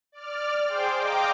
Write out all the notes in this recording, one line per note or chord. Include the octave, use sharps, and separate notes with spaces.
D5 F6
G#4 C5 G5 C6 D6
D#5 F5 G5 A#5 D6